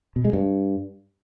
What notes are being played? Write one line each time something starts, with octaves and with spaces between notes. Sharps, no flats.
B2
G#3
G2